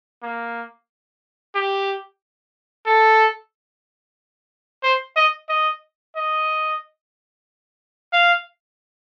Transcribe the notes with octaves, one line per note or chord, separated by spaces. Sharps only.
A#3
G4
A4
C5
D#5
D#5
D#5
F5